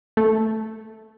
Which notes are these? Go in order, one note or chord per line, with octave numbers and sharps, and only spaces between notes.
A3